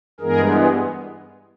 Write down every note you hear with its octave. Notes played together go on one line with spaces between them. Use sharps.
G2 E3 G#3 B3 G#4 A#4